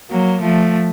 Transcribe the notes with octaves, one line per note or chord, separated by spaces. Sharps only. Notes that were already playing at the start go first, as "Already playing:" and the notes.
F#3 A#3
F3 A3